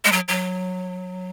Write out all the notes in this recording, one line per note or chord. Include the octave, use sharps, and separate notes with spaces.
G#3
F#3
F#3